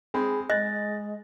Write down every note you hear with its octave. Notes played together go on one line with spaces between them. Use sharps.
G#3 C4 G#4 B5
G#3 D#5 F#6 A6 A#6